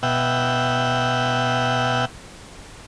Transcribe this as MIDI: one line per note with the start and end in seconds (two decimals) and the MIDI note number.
0.03 2.05 47
0.03 2.05 76
0.03 2.05 78
0.03 2.05 79